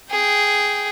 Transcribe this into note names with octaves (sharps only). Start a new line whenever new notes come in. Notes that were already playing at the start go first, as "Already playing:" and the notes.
G#4 G5